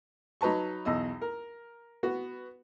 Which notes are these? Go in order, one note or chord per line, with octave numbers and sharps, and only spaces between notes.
F#3 D#4 B4 A5 C#6
B1 E2 D#5 E6
A#4
B3 F#4